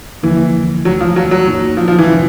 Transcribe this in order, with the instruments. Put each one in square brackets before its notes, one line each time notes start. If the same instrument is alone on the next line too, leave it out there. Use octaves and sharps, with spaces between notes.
[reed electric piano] D#2 D3 F3 A#3 [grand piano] E3
[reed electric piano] D2 C#3 E3 A3 [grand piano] F#3
[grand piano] F3
F#3
F#3
[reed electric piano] A#2 F#3 A#3 D#4 F#4
[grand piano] F3
F3
E3
[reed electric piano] C3 F3 G#3 C#4